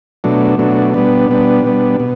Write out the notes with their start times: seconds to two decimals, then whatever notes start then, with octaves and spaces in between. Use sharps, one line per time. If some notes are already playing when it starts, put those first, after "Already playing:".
0.24 B2 F#3 A3 D4
0.59 B2 F#3 A3 D4
0.94 B2 G3 B3 D4
1.29 B2 G3 B3 D4
1.64 B2 G3 B3 D4
2.00 B2